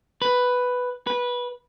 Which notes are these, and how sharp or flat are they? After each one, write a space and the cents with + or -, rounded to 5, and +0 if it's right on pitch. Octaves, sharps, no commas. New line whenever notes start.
B4 +5
B4 -15